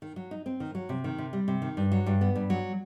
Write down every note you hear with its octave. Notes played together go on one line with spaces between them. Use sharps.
D#3
F#3
D#4
C4
D#3
F#3
C3
D#3
C3
G3
C3
D#3
G2
F#3
G2
B3
G2
F#3